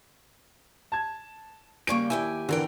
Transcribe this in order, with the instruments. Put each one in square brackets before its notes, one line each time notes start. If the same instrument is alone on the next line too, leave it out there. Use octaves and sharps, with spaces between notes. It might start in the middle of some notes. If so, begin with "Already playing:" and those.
[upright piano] A5 G#6
[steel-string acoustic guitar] C#3 G3 A#3 [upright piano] C#6 D7
[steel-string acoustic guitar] D#2 G4 G#5 [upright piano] E4
[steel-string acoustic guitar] E2 A#4 G5 [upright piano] D3 E3